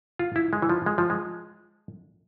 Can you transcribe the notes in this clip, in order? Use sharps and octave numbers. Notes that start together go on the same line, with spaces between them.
F4
E4
G#3
E3
F3
G#3
F3
G#3